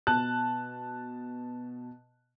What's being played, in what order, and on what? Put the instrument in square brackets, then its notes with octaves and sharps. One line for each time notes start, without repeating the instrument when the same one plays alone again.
[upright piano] B2 A5 F#6